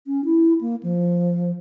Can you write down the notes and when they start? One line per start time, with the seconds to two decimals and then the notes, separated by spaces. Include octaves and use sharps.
0.07 C#4
0.25 E4
0.61 A#3
0.83 F3